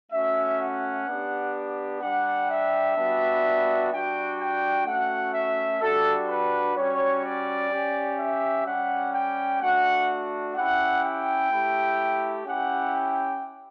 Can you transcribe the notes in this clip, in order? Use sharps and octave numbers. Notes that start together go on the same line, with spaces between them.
A3 C#4 F#4 E5
F#5
B3 D4 G4
G3 D4 G4 F#5
E5
G3 B3 D4 F#4
G3 D4 F#4 G5
G5
A3 C#4 F#4 F#5
E5
G3 D4 F#4 A4
B4
G3 C#4 F#4 C#5
D5
C#4 G4
E5
G3 C#4 G4 F#5
G5
A3 D4 F#4 F#5
C#4 E4 G4 F#5
G5
A3 E4 G4
C#4 E4 G4 F#5
G5